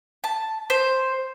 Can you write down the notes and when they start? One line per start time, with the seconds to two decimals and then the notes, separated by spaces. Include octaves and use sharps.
0.24 A5
0.70 C5